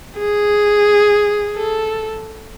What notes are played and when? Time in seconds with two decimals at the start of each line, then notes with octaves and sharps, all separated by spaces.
0.19 G#4
1.57 A4